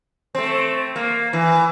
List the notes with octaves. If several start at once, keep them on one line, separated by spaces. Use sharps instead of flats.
A3 C4
A#3
E3